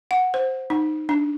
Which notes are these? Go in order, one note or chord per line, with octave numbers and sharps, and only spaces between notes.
F#5
C5
D#4
D4